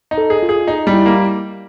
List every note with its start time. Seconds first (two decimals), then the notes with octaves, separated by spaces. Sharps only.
0.11 D#4
0.18 A4
0.30 G#4
0.43 F4
0.49 G#4
0.68 D#4
0.87 G3
0.93 E4
1.06 A#3